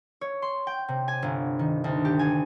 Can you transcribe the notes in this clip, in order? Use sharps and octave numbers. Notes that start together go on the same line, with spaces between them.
C#5
C6
G5
C3
G#5
G1
D#3
D2
G4
G#5